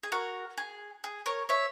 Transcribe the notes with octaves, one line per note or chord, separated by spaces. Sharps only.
G#4
F#4 A#4
G#4
G#4
A#4 C#5
C#5 E5